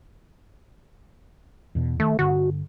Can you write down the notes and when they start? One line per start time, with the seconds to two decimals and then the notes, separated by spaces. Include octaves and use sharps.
1.75 E2 B2
2.00 D#3 A3
2.19 G2 D3 F#4